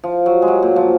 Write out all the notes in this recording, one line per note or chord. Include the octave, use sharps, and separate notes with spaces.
F3
F#3
G#3
F#3
A#2
F3